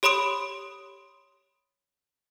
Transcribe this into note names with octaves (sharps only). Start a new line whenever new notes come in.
G4 C#5 B5 C6 D#6 D7